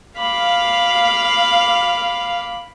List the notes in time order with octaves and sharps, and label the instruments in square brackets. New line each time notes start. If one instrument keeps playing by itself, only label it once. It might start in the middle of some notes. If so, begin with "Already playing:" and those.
[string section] F5 [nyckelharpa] B5 D6